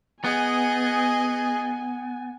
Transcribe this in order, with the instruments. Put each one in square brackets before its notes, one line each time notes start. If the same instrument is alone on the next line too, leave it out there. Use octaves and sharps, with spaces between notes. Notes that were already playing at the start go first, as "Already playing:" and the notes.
[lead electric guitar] B3 [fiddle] G#4 D#5 [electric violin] G#5